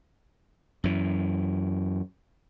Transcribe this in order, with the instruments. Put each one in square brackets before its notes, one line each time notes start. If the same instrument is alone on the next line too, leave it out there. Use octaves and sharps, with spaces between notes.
[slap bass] F#2 E3